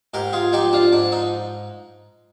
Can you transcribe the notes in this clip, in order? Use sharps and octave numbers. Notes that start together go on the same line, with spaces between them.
G#2 G4 A#4
F4 G#4
F3 D#4 G4
D4 F4
G#2 D4
D#4